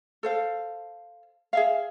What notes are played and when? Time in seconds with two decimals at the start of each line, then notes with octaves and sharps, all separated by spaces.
0.23 A4 C5 F5
1.53 G#4 E5 F5